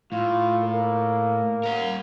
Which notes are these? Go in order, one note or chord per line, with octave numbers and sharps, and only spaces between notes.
A2 F4
A#3
A#4 F#5